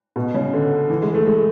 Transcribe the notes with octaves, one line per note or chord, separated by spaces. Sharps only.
B2
C#3
D3
E3
G#3
A3
G#3